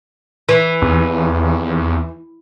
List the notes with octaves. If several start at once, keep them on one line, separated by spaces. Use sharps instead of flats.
E3
E2